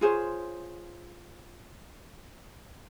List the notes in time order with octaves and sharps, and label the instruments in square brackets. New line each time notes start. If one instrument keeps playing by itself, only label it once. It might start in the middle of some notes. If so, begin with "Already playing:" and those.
[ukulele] F4 G#4 C5 C#5